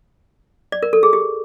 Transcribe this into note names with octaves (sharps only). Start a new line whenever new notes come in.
D5
A#4
A4
G#4
G4